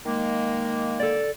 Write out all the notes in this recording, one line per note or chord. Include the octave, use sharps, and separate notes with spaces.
D#3 G#3 A#3
A4 D5